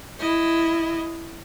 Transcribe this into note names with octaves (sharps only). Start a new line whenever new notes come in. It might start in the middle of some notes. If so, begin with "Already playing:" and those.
E4 D#5